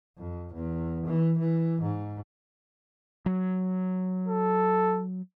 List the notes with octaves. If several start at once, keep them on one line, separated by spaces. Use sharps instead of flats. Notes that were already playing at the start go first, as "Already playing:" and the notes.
F2
E2
E3
E3
G#2
F#3
A4